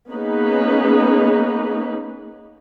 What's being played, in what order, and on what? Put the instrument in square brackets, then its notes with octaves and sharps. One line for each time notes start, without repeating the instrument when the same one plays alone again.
[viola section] A#3 B3 C#4 D#4 G#4 B4